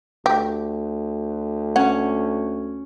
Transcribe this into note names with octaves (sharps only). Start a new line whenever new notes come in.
D2 G4
C#4 F#5